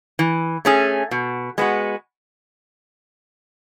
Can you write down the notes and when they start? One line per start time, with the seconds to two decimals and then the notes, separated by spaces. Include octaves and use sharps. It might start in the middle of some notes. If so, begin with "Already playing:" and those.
0.19 E3
0.65 A3 C#4 G#4
1.11 B2
1.58 G#3 B3 F#4